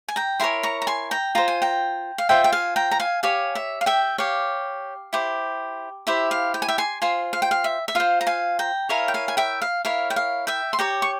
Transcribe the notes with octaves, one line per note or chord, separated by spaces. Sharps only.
G#5
G5 A#5
E4 A#4 C#5 G#5 C6
A#5 C#6
A#5
G#5 C6
G5 A#5
F4 C5 A#5
G#5
G5 A#5
F5
F4 C5 E5 G5
G5
F5 G#5
G5 A#5
A#5
F5 G#5
G4 C#5 F5 G#5
E5
F5
E5 G5
G4 C#5 F5
E4 G4 C5
E4 G4 C5 E5
F5
G5
G#5
E5 G5
G#5 C6
F4 C5 G#5 C6
F5
G5
F5
E5
E5
F4 C5 F5
A#5
F5 G#5
G5 A#5
E4 A#4 C#5 F5 G#5
G5
F5 G#5
G#5
E5 G5
F5
E4 A#4 C#5 F5
G5
F5
E5 G5
C6
G4 C#5 G5 A#5
C#6